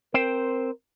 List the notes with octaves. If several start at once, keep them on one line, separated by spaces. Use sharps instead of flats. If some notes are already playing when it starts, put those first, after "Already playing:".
C4 A#4 C5 G5